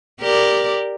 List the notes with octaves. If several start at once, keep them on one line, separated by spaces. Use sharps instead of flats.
G4 A#4 D5